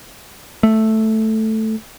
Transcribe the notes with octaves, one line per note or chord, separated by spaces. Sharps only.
A3